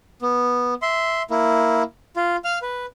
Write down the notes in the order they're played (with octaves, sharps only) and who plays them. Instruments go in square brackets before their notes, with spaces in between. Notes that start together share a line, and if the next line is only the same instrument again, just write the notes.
[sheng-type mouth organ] B3
E5 C6
A#3 E4
F4
F5 F6
B4